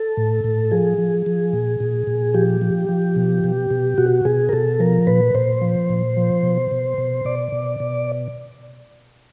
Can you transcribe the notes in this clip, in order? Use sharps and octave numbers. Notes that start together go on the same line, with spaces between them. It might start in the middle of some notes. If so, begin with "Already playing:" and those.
Already playing: A4
A2
A2
F3 G#4
F3
F3
A#2
A#2
A#2
F3 G4
F3
F3
B2
B2
B2
B2 F#4
B2 G#4
A#4
B2 A4
F3 A#4
A#2 B4
A#2 C5
F3
A#2
F3
B2
B2
B2
B2 D5
B2
B2